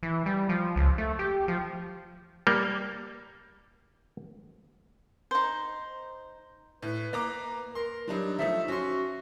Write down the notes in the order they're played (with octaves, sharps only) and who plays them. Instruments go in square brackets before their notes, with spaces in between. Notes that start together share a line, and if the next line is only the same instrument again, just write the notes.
[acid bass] E3
G3
F3
C#2
A3
G4
F3
[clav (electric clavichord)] G3 A#3
[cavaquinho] D#4 C5
[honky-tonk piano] A2 [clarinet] B4
[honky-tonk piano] A#3 A#5 D6
[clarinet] A#4 [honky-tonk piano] C6
[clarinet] F#3 [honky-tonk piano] G3 D4 D#4
[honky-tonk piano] F3 A3 D#4 [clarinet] E5
[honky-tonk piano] C#4 C6 [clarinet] F#4